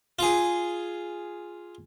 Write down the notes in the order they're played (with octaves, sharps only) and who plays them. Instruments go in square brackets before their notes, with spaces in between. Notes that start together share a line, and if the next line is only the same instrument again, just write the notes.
[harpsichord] F4 G#4